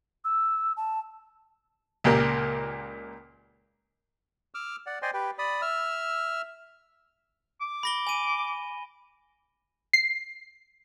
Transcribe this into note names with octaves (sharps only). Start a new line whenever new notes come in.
E6
A5
C#2 A#2 G4 A#4
D6 E6 F6
D5 F#5
C5 D5 D#5 G5 G#5 C6
G4 B4 G5
D5 B5 D#6
E5 E6 F6
D6
B5 A#6 G7
G#5 D#7
C7